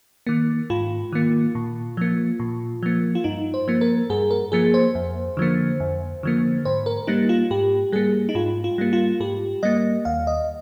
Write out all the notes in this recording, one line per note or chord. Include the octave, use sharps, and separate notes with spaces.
D#3 A#3
G#2 F4
D#3 A#3
A#2
F3 A#3
A#2
F3 A#3
F4
G2 D#4
C5
F3 A#3
A#4
G2 G#4
A#4
F3 A#3 G#4
C5
F2
D3 F3 A#3
F2
D3 F3 A#3
G#2 C5
A#4
G3 A#3 D#4
F4
G#2 G4
G3 A#3 G#4
D#4
G#2 F4
F4
G3 A#3
F4
G#2 G4
G3 A#3 D#5
D#2 F5
D#5